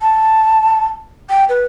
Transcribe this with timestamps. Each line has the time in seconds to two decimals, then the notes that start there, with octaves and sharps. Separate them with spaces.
0.01 A5
1.30 G5
1.49 B4